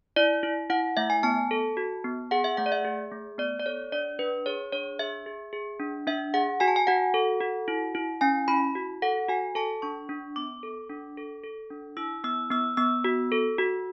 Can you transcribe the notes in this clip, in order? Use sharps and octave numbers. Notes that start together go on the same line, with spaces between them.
E4 D5
E4
E4 F#5
A3 E5
G#5
B3 A5
A4
F#4
B3
G#4 F#5
E5
A3 F#5
D5
E5
G#4
A3
B3 D5
D5
A4 C#5
D4 D5
D4 B4
G#4 C#5
D4 C#5
G#4 E5
G#4
G#4
D4
D4 E5
G#4 F#5
F#4 G#5
A5
G#5
F#4 F#5
A4
F#4
E4
E4
C#4 G#5
E4 B5
F#4
A4 F#5
F#4 G#5
A4 A5
D4 C#6
D4
B3 D6
A4
D4
A4
A4
D4
E4 E6
B3 E6
B3 E6
B3 E6
F#4
A4
F#4